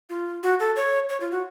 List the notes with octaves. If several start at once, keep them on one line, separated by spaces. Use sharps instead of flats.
F4
F#4
A4
C#5
C#5
F4
F#4